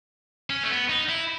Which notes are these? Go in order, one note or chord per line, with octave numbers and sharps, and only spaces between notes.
C#4
A3
B3
D#4
E4